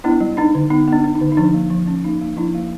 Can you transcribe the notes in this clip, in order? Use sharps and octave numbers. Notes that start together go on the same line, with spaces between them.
B3 D4 E4
G3
D4 D#4
D3
B3 D#4
B3 D4
D4
D#4
D3
D#4
F3 D4
A#3
F3
C#4
A#3 D#4
A#3
F3 D4 E4
A#3